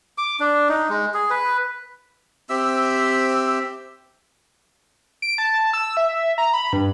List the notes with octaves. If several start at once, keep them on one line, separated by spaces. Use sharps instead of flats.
D6
D4
D#4
G#3
G#4
B4
C4 G4 E5 E6
D7
A5
E6
E5
A#5
B5
G2